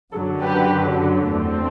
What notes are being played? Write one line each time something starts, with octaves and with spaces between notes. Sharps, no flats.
F#2 D3 F#3 A4
G4 B4
E2 D3 A3 C4